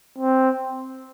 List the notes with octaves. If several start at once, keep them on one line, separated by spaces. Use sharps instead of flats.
C4